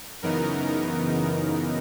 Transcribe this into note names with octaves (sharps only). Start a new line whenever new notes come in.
F#2 C#3 E3 B3 D#4 A#4
A#4